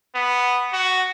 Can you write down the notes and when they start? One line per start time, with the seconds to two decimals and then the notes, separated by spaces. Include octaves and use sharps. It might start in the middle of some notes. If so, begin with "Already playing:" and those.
0.15 B3
0.73 F#4